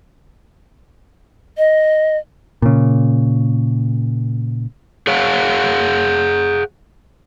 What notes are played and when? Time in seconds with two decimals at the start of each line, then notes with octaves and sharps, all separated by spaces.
1.58 D#5
2.62 A#2 C#3
5.07 G#4 C#5 F5 F#5